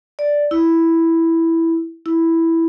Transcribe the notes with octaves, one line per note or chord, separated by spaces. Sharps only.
D5
E4
E4